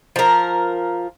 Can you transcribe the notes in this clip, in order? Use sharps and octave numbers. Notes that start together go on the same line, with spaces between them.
F3 A#4